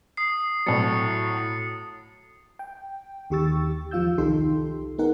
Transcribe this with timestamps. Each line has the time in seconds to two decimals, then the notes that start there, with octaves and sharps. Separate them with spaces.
0.17 D#6 C7
0.66 A2 F#3 A6 C#7
2.59 G5
3.30 D#2 D#3 G4 C#6 E6 A6
3.91 E2 F3 F4 F5 E6 G6
4.18 C2 D#3 D#4 G4 A4 C6
4.98 B3 D#4 G#4 A#4 F#5